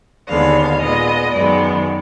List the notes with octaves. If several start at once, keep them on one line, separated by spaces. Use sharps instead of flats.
D#2 D3 G#3 B3 F5
A#2 G#3 B3 D#5
F#2 D#3 G#3 B3 D5